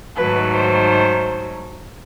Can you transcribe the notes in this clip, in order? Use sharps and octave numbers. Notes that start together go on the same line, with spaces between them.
G#2 D#3 F#3 A3 B4
C5